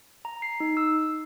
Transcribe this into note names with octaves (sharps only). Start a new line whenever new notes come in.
A#5
C7
D#4
E6